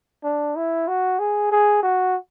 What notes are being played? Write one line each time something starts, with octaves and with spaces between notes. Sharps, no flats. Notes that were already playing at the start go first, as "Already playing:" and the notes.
D4
E4
F#4
G#4
G#4
F#4